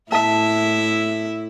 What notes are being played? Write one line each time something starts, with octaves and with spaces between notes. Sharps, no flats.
A2 E4 E5 A5